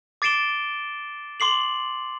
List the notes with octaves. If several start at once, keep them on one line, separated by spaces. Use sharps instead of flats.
D6 A6 C7 D7 E7 G7
C6 D6 C7 F#7